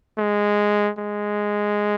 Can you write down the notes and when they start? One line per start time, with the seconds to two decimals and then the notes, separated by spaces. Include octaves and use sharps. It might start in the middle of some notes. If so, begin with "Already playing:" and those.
0.18 G#3
0.98 G#3